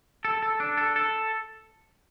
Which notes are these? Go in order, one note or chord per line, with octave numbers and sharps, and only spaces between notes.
A4
A4
D4
A4
A4